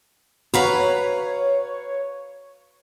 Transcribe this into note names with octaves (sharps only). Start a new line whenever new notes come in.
F#4 B4 C#5 F5 A#5 B5